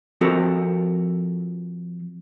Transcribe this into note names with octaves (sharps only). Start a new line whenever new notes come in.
F3 C4 F#4 A4 A#4